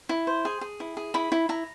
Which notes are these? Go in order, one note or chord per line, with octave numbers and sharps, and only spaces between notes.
E4
C5
G#4
G#4
E4
G#4
E4 B5
E4
E4 A#5